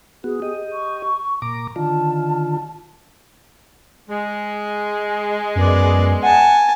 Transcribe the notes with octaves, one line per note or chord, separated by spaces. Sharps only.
B3 F#4 G#4
G4 D#5
C#6
A#2 A#5 D6
D3 D#3 F4 A5
G#3
F#2 B3 D5
F#5 G#5 A5